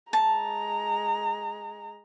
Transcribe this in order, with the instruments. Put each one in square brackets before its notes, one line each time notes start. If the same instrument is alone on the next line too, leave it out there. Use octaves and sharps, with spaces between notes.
[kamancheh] G#3 A#5 [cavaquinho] A5